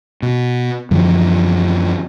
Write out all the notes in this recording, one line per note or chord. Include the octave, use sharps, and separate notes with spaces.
B2
F#2 D3 E3 F3